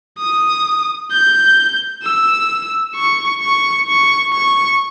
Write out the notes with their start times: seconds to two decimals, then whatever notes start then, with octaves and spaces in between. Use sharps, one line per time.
0.19 D#6
1.11 G6
2.03 E6
2.95 C#6
3.42 C#6
3.88 C#6
4.34 C#6